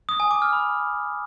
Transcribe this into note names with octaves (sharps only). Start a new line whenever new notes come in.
D#6
G#5
D6
F6
B5